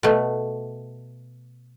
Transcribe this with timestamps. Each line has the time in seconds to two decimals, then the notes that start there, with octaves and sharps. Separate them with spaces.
0.03 B2 A3